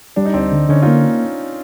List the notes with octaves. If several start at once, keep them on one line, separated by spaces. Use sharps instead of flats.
G3 D4
D#4
D2 C4 D4
D3
D3 C#4 D#4
A#3 D#4 F4